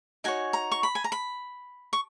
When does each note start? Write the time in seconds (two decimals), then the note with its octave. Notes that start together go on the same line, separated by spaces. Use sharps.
0.24 D#4 F#4 C#5 G#5
0.53 A#5
0.71 C#6
0.83 B5
0.95 G#5
1.04 A#5
1.12 B5
1.93 C#6